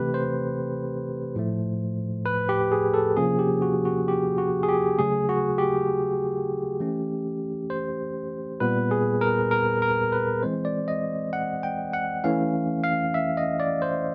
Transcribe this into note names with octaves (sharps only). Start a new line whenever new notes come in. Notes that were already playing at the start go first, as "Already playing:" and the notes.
Already playing: C3 E3 A3 C4 G4 B4
C5
A2 F3 A3
B4
G4
G#4
A4
C3 F3 A#3 C#4 G#4
G4
F#4
F#4
G4
F#4
G#4
G4
C#3 F#3 A3 G#4
F#4
G4
E3 A3 C#4
C5
A#2 G3 B3 B4
G#4
A#4
A#4
A#4
B4
E3 G#3 C4 C5
D5
D#5
F#5
G5
F#5
E3 A3 C#4 F5
F5
E5
D#5
D5
C5